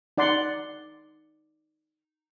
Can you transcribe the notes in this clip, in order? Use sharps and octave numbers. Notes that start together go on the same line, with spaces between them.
D#4 D5 F#5 C6